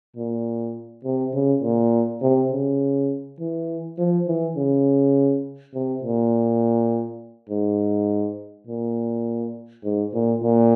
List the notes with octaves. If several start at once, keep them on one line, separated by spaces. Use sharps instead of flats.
A#2
C3
C#3
A#2
C3
C#3
E3
F3
E3
C#3
C3
A#2
G#2
A#2
G#2
A#2
A#2